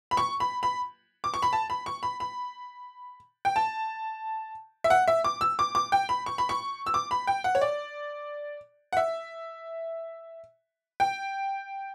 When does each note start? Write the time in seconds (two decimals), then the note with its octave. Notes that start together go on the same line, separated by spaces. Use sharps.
0.11 B5
0.17 C#6
0.40 B5
0.63 B5
1.24 D6
1.34 C#6
1.42 B5
1.53 A5
1.70 B5
1.86 C#6
2.03 B5
2.20 B5
3.45 G5
3.56 A5
4.84 E5
4.90 F#5
5.08 E5
5.24 D6
5.41 E6
5.59 D6
5.75 D6
5.92 G5
6.09 B5
6.26 C#6
6.38 B5
6.49 C#6
6.86 E6
6.94 D6
7.11 B5
7.27 G5
7.44 F#5
7.55 C#5
7.62 D5
8.93 F#5
8.97 E5
11.00 G5